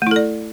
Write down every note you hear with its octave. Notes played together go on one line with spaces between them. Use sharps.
A3 E4 A4 D5